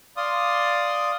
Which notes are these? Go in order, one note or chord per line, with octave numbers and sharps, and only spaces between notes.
D5 F5 C6 D#6